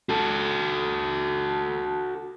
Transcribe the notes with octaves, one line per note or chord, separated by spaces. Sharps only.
F#4 A4